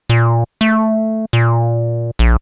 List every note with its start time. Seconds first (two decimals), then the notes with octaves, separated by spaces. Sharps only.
0.10 A#2
0.61 A3
1.33 A#2
2.19 A#1